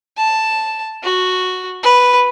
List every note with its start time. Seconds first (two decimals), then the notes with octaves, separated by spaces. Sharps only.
0.17 A5
1.04 F#4
1.83 B4